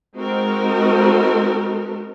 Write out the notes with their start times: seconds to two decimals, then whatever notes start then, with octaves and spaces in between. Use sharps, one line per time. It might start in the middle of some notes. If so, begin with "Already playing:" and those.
0.16 G#3 C4 D#4 F#4 A#4